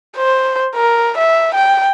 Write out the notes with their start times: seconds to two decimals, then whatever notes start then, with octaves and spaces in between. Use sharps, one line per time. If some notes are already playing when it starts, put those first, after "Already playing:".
0.17 C5
0.75 A#4
1.18 E5
1.55 G5